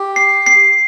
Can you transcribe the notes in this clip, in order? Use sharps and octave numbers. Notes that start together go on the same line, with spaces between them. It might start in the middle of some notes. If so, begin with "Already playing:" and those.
Already playing: G4
C7
C7